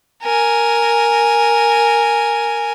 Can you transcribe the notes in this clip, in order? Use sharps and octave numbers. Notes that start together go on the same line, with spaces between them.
A#4 G#5